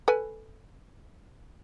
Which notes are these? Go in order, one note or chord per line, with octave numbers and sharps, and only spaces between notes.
A4 B4 G#5